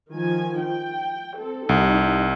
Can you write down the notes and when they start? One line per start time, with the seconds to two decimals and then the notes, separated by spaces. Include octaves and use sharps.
0.13 D#3 F3 G#5
0.61 G5
1.40 C4 A4
1.69 C2 D#4